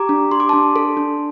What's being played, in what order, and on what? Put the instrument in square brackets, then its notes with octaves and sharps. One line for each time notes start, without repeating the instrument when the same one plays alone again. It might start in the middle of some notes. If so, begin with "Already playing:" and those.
Already playing: [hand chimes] G4 A#5 D6
D4
G4 C6
D6
D4 A5 C6
A4
D4